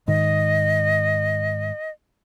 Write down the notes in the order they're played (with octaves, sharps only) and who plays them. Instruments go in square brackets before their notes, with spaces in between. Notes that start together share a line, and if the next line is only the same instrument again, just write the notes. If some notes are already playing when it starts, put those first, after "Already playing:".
[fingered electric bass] G#2 D#3 [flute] D#5